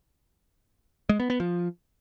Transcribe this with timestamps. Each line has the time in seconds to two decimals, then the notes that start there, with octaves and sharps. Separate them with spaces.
1.09 G#3
1.20 B3
1.30 B3
1.40 F3